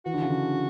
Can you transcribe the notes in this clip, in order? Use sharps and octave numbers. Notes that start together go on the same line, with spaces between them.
E3 F#4
D3
C#3
D3